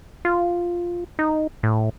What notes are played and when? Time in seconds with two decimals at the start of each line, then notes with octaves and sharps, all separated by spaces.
0.25 F4
1.19 D#4
1.63 A2